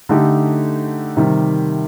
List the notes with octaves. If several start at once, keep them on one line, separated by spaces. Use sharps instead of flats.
D3 A3 D#4 G4
C3 D#3 G3